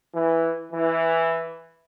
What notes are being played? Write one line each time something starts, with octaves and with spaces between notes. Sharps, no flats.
E3
E3